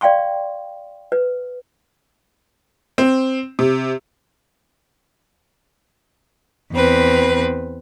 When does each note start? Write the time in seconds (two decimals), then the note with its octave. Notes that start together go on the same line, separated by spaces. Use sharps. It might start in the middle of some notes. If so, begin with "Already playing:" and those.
0.01 D5 F5 G5 C6 C#6
1.12 B4
2.98 C4
3.59 C3
6.73 E2 C4 B4